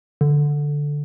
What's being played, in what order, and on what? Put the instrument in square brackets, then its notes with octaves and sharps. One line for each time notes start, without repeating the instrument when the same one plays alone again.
[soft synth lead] D3